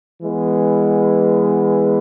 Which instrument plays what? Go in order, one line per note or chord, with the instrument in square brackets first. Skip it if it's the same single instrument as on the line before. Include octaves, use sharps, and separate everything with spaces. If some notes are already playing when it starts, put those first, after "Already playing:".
[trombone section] E3 G#3 B3